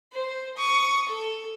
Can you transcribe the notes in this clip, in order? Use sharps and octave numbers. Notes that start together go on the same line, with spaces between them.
C5
C#6 D#6
A4